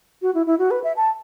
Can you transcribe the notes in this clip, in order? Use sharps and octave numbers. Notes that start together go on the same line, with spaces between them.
F#4
E4
E4
F#4
B4
E5
A5